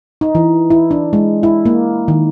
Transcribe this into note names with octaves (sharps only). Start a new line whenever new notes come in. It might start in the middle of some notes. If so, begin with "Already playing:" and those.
D#4
E3
E4
D4
G#3
E4
A#3
D#3